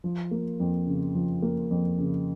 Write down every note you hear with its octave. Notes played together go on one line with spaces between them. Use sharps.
F3
A#3
F2
C#3
F3
A#3
F2
C#3